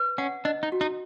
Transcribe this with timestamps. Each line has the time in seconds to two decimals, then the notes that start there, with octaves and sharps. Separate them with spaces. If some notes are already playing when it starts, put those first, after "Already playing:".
Already playing: B4
0.18 C#4 F#5
0.45 D4 D#5
0.63 D#4
0.72 F#4
0.81 D#4